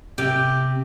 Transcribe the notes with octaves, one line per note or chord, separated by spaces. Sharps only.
C3 G4